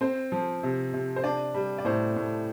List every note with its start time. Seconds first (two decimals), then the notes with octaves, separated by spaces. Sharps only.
0.01 C4 C5
0.32 F3
0.63 C3
0.94 C3
1.16 C5
1.24 D4 D5
1.55 G3
1.78 D5
1.85 A2 C5
2.16 A2